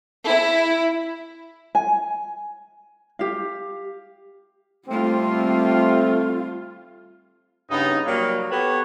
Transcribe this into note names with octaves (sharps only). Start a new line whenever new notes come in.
E4
G#5
G4 F5
G3 A3 C4 F4
G2 C#3 B3 D#4
F#3 G3 A#3
B3 G4 A4 B4 C#5